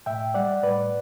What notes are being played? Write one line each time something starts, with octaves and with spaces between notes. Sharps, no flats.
A2 E5 G5
G3 D5 F#5
A2 B4 D5